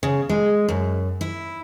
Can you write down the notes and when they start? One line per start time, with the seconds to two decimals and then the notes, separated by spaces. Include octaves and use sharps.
0.03 C#3
0.29 G#3
0.68 F#2
1.21 E4